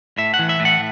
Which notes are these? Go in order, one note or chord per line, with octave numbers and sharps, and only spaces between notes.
A2 E5
F#5
E3
E5
A2
F#5